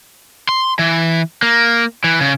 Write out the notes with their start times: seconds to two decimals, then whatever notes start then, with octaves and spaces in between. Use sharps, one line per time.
0.49 C6
0.79 E3
1.42 A#3
2.04 E3
2.21 C#3